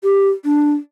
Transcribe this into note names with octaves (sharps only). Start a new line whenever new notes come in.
G4
D4